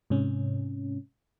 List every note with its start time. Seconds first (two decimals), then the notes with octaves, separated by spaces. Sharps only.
0.10 G#2 C3 C#4